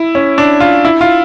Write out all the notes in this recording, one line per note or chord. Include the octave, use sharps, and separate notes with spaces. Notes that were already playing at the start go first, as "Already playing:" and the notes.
Already playing: E4
C#4
D4
F4
E4
F4